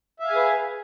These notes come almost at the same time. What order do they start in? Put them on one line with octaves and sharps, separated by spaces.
E5 F5 G#5 G#4 B4